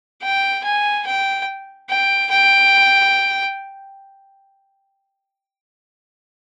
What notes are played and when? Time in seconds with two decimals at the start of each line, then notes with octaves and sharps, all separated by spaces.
0.23 G5
0.65 G#5
1.06 G5
1.90 G5
2.31 G5